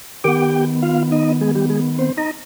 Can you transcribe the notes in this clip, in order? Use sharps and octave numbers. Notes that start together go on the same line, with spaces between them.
D#3 B3 G4 G5
F4 F5
D#4 D#5
G#3 G#4
G3 G4
G#3 G#4
C4 C5
D#4 D#5